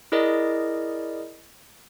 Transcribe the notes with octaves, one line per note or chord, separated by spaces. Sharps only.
E4 G#4 A#4 D5 D#5